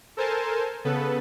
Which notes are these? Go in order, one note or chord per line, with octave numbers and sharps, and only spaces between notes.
A4 A#4 C5 G#5 A5
C#3 B3 A4 B4